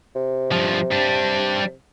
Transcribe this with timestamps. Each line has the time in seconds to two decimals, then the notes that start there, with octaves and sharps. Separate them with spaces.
0.16 C3
0.52 G2 F3
0.92 G3 D4